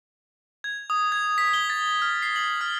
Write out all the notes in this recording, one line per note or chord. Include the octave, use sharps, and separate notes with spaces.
G#6
D#6
G#6
B6
G7
A6
F6
C7
F#7
F6